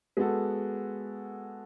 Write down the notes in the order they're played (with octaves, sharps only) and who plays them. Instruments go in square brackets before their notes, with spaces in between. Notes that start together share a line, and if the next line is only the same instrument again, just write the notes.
[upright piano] G#3 B3 F#4 A4